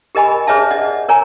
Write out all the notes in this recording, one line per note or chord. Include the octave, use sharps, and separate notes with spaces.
G4 A#4 D#5 G#5 B5
G#4 B4 C#5 D#5 E5 A5
D5 D#5 F#5
A#4 C#5 G#5 A#5